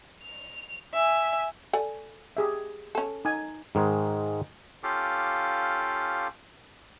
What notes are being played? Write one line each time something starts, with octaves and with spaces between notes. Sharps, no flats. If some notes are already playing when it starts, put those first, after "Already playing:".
F7
E5 G#5
A4 D5 G#5
G4 G#4 E5
C#4 A4
D#4 G#5
G#2 D#3 G#3
C#4 F4 G4 A4 F5 D6